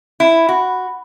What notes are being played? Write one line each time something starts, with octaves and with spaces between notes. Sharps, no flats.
E4
F#4